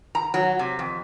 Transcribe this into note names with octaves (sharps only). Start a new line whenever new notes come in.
A#5
F#3
C3
F2